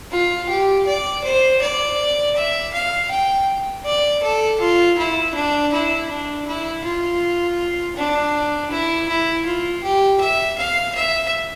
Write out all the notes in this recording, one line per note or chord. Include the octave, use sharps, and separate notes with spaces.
F4
G4
D5
C5
D5
E5
F5
G5
D5
A4
F4
E4
D4
E4
D4
E4
F4
D4
E4
E4
F4
G4
E5
F5
E5